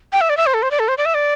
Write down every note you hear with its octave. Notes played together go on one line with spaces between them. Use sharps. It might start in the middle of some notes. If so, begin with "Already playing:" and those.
G5
E5
D5
E5
C5
A4
C5
D5
A4
C5
D5
E5
D5